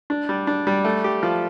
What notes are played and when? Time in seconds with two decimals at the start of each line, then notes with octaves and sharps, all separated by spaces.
0.10 D4
0.29 G3
0.47 D4
0.67 G3
0.85 A3
1.04 G4
1.23 F3